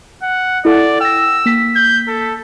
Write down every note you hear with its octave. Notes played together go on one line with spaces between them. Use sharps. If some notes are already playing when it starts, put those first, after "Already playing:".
F#5
E4 A4 D5 F#5
G5 E6 A#6
A#3 B6
G6
A4